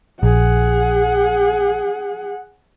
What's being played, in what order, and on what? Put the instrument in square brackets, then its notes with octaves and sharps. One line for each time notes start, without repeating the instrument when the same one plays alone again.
[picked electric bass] A#1 [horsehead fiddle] G#4 F#5